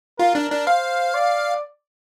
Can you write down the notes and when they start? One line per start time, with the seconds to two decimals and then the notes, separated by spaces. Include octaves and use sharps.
0.19 F4 A#4
0.35 D4
0.52 D4
0.67 C5 F5
1.15 D5